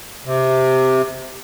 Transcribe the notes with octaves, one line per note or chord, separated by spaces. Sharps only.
C3